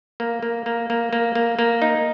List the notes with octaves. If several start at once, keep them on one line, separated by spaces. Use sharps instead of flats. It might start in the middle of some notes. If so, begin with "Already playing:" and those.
A#3
A#3
A#3
A#3
A#3
A#3
A#3
D#4